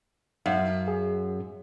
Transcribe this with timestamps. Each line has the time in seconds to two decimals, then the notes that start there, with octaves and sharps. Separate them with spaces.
0.46 F#2 F5
0.88 G#4